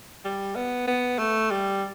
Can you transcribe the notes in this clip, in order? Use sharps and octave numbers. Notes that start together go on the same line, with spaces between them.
G3
B3
B3
A3
G3